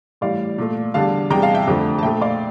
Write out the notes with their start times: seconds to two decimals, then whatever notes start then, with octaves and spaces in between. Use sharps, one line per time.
0.21 A2 E3 G3 D5 F5
0.58 A#2 A3
0.94 E2 D3 G3 F5 A5
1.30 E2 C3 G3 G5 A#5
1.42 F5 A5
1.55 E5 G5
1.67 F2 D3 F3 A3
1.98 A5
2.03 A#2 A3 E5 G5
2.21 D5 F5